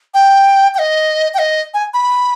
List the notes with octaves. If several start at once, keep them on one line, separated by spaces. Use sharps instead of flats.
G5
G5
D#5
G5
D#5
G#5
B5